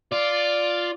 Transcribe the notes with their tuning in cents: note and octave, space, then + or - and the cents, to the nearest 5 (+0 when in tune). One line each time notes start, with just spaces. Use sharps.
F4 +0 D5 +0